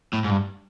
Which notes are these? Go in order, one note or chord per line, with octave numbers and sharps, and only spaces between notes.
A2
G#2
G2